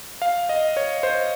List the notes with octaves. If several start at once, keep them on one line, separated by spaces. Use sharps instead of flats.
F5
D#5
C#5
C5